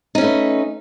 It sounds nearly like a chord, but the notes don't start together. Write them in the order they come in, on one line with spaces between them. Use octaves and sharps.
D#4 C#4 A3 B4